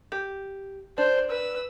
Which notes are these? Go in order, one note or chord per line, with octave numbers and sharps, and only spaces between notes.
G4
D4 C5
B4 E6